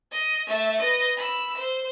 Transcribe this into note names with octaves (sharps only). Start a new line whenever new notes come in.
D#5
A3 E5
B4 D#5
B5 E6
C5